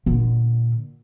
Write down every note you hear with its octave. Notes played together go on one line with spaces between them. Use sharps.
A#2 D3